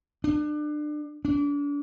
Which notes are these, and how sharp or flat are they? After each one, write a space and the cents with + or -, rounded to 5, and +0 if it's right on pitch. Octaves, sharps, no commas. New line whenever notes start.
D4 +30
D4 -35